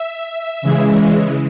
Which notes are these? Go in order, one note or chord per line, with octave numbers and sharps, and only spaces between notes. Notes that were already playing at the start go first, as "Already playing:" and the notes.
Already playing: E5
C#3 E3 G#3